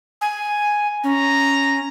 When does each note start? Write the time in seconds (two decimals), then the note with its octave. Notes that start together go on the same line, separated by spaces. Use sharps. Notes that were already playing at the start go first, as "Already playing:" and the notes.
0.21 G#5
1.04 C#4 A#5